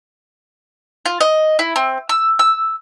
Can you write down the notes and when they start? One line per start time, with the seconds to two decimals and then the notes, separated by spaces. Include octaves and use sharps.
1.06 F4
1.21 D#5
1.59 E4
1.76 C4
2.09 E6
2.39 E6